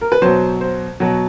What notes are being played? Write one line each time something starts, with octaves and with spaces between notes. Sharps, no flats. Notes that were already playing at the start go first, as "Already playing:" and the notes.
A#4
B4
B2 F#3 C5
C5
B2 F#3